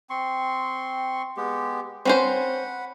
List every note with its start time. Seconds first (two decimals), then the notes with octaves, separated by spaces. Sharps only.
0.10 C4 C6 C#6
1.37 G#3 B3 G4
2.05 C4 C#4 C5 F#5 B5